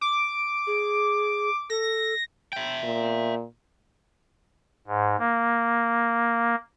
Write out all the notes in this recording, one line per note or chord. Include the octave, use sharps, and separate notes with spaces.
D6
G#4
A4 A#6
E5 G5
A#2
G#2
A#3